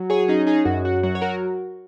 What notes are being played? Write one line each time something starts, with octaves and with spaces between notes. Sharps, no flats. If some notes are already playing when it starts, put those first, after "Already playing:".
Already playing: F#3
G#4 C#5
C#4 D#4 G#4
D#4 G#4
F#2 F#4
F#4
F#3 F#4
C#5
F#4 A#4